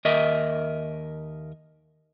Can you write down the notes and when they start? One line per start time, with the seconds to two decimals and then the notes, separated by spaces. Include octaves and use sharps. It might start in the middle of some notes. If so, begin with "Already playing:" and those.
0.05 D#2 A#4 D#5 E5